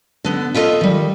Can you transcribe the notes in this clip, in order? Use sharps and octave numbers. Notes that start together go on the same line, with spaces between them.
D3 B3
E4 F4 A4 C#5 D#5 E5
D#3 G3